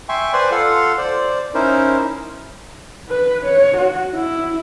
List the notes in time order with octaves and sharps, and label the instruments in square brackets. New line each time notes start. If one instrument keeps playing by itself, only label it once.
[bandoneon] E5 G5 G#5 C6 C#6
B4 C5 D5 G#5 C6
F4 A4 F5 F#5 C6
C5 D5
C#4 D#4 E4 A#4 C5
[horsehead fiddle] B4
C#5
F#4
E4